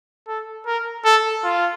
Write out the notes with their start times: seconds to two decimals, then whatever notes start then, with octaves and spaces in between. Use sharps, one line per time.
0.28 A4
0.66 A#4
1.05 A4
1.44 F4